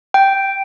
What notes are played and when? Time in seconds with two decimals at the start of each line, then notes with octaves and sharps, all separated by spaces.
0.14 G5